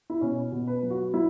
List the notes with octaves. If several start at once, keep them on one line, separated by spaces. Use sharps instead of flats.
E4
B2 C#4
B2
B4
F#3
F#4
F#3 E4